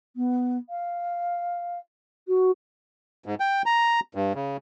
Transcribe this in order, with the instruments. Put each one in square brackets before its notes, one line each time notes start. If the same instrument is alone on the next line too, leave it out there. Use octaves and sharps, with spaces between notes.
[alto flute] B3
F5
F#4
[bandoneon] G#2
G5
A#5
G2
C#3